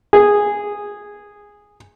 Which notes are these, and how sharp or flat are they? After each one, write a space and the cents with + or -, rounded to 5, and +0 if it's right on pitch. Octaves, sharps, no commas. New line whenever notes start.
G#4 -10